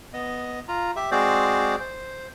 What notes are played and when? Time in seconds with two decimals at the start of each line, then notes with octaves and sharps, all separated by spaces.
0.14 B3 D#5
0.68 F4 A#5
0.96 G4 E5
1.11 G#3 C4 F#4 G#4 C5 D5
1.80 C5